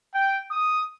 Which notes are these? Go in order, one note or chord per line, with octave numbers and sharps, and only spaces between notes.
G5
D#6